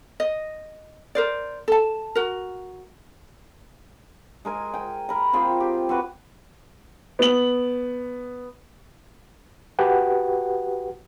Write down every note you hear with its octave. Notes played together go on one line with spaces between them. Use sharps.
D#5
A#4 C5 D5
A4 A5
F#4 A#4
G#3 A#4 G#5
G5 G#5
A#4 B5
C4 F4 G#4 G5
G4
C4 F#4 B4
B3 F#7
F#4 G4 B4 F#5